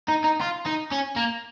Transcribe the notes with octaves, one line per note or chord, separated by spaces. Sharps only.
D#4
D#4
F4
D#4
C#4
A#3